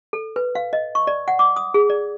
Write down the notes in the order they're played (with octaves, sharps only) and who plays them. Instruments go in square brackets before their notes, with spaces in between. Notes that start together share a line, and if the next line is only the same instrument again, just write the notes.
[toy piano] A4
B4
F5
D#5
C#6
D5
F#5
D6
D#6
G#4
D5